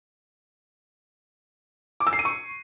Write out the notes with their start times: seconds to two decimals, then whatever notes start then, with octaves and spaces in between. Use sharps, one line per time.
2.00 D6
2.07 E6
2.13 C7
2.19 D#7
2.25 C#6